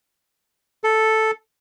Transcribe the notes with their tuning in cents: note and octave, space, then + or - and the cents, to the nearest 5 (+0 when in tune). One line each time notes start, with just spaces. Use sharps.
A4 -5